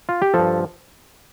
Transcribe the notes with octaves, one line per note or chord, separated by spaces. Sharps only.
F4
G4
G2 F3 A4